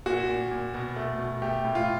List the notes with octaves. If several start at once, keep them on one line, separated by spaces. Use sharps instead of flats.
A#2 F#4
A#2
A#2
B2
A3
B2
A3 G4
A2
F4